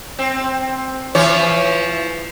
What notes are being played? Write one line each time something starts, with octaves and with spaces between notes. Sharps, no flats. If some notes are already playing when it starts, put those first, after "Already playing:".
C4
E3 F3 C#5